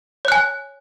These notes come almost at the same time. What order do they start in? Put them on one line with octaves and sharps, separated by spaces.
C#5 F#6 G#5